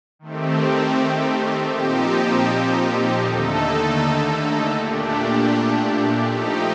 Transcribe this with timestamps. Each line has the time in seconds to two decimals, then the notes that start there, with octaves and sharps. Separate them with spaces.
0.19 D#3 A3 C4 G4
1.72 A#2 F3 C4 D#4 G4
3.23 D#2 D3 A3 D#4 A4
4.76 A#2 A3 D4 G4
6.28 F3 A3 D#4 G4